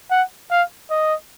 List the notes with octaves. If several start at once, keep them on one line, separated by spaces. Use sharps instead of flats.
F#5
F5
D#5